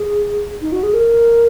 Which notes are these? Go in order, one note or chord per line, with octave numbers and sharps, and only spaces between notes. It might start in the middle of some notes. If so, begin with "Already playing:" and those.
Already playing: G#4
D#4
F#4
G#4
A#4